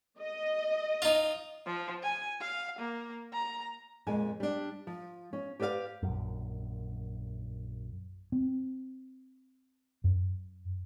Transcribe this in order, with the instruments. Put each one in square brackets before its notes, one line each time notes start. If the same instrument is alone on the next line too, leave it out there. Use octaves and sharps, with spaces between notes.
[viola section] D#5
[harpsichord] D#4 F4
[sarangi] F3
G#5
F5
A#3
A#5
[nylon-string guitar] F2 A#2 G#3 G#5
G3 D4
F3
C#4
G4 B4 D5 E5 F5
[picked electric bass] A#1 F#2
[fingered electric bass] C4
F#2